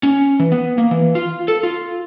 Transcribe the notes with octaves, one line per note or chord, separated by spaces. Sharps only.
C#4
E3
B3
A#3
E3
F4
A4
F4